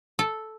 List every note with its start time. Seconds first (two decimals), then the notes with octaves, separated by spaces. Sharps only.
0.19 A4